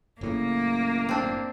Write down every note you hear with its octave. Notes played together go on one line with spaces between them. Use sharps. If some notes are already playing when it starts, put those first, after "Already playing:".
F#1 A2 C#3 A#3
C4 D4